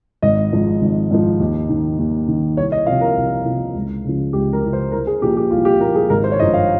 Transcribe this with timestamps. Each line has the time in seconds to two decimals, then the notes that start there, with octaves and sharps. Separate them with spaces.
0.22 G#1 D#5
0.52 G#2 F3
0.82 G#1
1.11 G#2 F3
1.40 D#2
1.69 D#3
1.98 D#2
2.28 D#3
2.57 C2 C#5
2.72 D#5
2.87 C3 F3 F5
3.01 A#4
3.17 C2
3.45 C3 F3
3.75 C#2
4.04 C#3 F3
4.33 C#2 G4
4.53 A#4
4.63 C#3 F3
4.73 C5
4.92 C2 A#4
5.07 G#4
5.22 A#2 F3 G4
5.37 G4
5.51 C2 F4
5.65 G4
5.80 A#2 F3 A#4
5.95 G#4
6.10 G#1 A#4
6.24 C5
6.32 C#5
6.39 G2 F3 D#5
6.54 F5